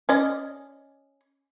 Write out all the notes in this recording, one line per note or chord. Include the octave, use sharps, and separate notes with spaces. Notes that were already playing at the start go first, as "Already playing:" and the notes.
C#4 D5 D#5